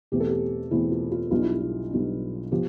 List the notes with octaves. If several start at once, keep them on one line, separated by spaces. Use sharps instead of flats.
E2 B2 A3 C4 G4
A4
G4
E2 B2 A3 C4 E4
F4
F4
B1 B2 G3 D4 F4
E4
E4
B1 B2 G3 D4
F3 B3 G4